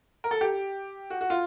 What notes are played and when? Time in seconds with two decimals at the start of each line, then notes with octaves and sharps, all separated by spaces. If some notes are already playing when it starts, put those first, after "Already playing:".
0.24 A#4
0.31 A4
0.41 G4
1.10 F#4
1.21 F#4
1.30 F4